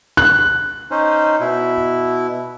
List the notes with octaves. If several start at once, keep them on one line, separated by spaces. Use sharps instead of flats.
F#6
C#4 D#4 C5
B2 E4